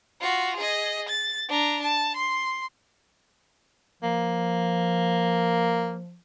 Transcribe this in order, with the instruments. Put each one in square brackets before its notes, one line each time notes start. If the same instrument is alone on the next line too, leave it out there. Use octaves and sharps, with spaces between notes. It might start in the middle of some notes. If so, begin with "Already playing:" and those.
[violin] F4 F#4
G#4 D#5
A6
D4 A#5
A5
C6
[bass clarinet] F3 [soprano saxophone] A#3